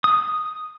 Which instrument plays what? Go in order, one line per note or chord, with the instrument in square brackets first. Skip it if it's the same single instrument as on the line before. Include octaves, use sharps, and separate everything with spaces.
[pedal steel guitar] D#6